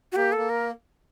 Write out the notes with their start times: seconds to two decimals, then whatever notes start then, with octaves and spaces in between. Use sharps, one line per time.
0.12 F#4
0.16 A#3 G4
0.32 A4
0.38 A#3
0.49 A#4